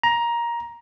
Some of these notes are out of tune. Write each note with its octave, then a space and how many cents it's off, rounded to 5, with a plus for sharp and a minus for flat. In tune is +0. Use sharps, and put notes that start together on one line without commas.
A#5 +15